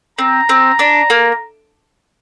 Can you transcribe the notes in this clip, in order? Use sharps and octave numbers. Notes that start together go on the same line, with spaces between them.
C4 A#5
C4
D4
A#3